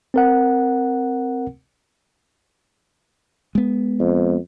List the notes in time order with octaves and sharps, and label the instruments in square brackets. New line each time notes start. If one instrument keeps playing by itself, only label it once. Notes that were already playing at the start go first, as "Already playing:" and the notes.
[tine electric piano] C4 A#4 F#5
[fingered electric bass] G#3 B3
[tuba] F2